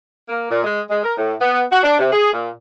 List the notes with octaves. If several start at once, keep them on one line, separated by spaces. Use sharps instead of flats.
A#3
A#2
G#3
G#3
A#4
A2
B3
F#4
D4
C3
G#4
A#2